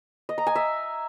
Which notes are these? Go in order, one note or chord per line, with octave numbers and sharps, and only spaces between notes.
D#5
A#5
G#5
E5